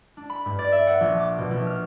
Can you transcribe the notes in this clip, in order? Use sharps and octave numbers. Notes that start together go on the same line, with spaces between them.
D4
B5
G2
D5
E5
F#5
A#1
D6
B2
A#1
F6